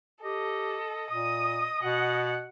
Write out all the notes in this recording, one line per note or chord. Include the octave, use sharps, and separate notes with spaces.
G4 A4 D#5
A#2 D#6
B2 F#5